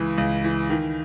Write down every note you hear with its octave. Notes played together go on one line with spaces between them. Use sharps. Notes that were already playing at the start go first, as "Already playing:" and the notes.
Already playing: C#2 E3
C#2
E3
D#3